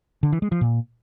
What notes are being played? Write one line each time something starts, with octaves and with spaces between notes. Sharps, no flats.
D3
E3
G#3
F3
A#2